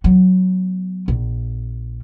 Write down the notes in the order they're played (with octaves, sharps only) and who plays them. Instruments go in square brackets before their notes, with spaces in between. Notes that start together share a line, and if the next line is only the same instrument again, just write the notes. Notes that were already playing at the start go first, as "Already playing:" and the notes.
[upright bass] F#3 B3
A#1